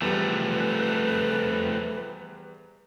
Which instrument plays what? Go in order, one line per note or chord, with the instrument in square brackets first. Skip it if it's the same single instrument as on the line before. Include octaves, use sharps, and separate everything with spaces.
[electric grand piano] E2 G3 [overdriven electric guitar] F3 A3 [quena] B4